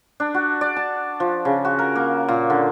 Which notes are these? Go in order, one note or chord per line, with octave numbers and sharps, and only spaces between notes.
D4
F#4
D5
A5
F3
C#3
F#4
A#4
A#3
A#2
D3